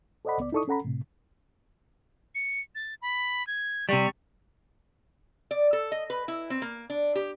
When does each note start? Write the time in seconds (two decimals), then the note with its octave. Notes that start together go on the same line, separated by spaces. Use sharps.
0.25 A4 C5 D5 D#5 F#5 B5
0.38 C#2 B3 D5
0.52 D#4 E4 A4 D5 C#6 D#6
0.68 C#4 A4 F#5 A#5 B5
0.84 A2 C3
2.35 C#7
2.75 A6
3.02 B5
3.47 G#6
3.89 C3 G3 C#6
5.51 D5
5.73 A4
5.92 D#5
6.10 B4
6.28 E4
6.50 C4
6.62 A#3
6.90 D4
7.15 G4